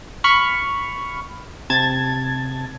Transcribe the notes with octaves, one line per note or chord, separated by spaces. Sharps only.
B5 C#6 F6
C3 A5 G#6 A6